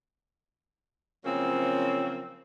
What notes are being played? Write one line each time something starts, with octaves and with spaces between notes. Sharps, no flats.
C#3 F3 F#3 A#3 C4 C#4